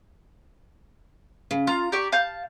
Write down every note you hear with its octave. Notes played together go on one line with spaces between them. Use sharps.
C#3
F4 A#5
G4 D5 C#6
F5 A5 G6